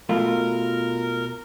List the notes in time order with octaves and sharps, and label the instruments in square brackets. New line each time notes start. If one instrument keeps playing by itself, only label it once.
[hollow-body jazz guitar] B2 A3 F4 [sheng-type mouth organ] A#4